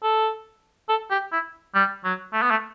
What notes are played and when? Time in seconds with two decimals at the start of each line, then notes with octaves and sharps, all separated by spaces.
0.03 A4
0.89 A4
1.11 G4
1.32 E4
1.75 G3
2.04 F#3
2.33 A3
2.42 B3
2.51 A3